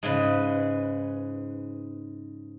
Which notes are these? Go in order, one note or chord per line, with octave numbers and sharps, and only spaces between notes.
G#2 C#3 B4